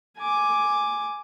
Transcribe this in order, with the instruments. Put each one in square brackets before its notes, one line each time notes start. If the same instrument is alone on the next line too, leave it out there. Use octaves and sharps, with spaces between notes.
[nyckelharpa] G#5 D6